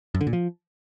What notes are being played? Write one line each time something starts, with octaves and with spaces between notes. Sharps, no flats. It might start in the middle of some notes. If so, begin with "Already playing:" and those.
F#2
D3
A#2
F3